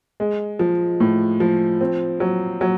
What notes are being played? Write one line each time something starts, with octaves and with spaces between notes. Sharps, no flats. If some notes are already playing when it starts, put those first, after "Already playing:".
G#3
F3
A2
F3
C4
F#3
F#3